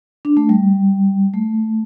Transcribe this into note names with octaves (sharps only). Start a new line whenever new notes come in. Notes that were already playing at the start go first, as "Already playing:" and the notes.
D4
A3
G3
A3